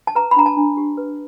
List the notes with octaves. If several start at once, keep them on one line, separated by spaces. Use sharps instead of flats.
A5
B4 A#5
B5
D4 A#5
A5
D4
G4
B4